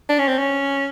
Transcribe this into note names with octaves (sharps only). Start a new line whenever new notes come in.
D4
C#4
C4
C#4